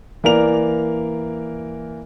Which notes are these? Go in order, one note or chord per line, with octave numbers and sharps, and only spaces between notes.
E3 A#3 A#4 D5 F7